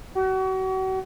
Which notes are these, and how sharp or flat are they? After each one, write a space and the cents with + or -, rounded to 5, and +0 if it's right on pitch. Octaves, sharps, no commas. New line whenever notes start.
F#4 +35